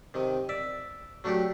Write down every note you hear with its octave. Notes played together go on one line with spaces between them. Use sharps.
C3 D#3
D5 E5
F#3 A3 D4 F#4 G4